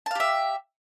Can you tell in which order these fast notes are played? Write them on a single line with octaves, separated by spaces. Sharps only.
A5 F5 G4 E5